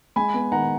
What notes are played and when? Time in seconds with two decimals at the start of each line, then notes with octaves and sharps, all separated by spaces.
0.16 G#3 G#5 B5
0.34 B3
0.52 D#3 F#5 A#5